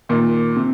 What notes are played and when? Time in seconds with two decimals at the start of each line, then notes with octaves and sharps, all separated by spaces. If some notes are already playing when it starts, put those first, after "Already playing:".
0.09 A#2 D#3
0.56 C3